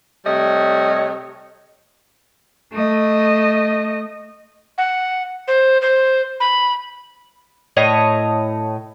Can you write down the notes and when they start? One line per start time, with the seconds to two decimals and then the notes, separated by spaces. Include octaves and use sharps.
0.25 C3 G3 A3 C#5 D#5
2.72 A3 D#5
4.78 F#5
5.48 C5
5.82 C5
6.40 B5
7.77 A2 C#5 D#5